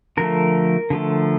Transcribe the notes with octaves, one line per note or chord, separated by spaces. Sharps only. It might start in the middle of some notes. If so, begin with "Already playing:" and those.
D3 F3 A3 A#4
D3 F3 A3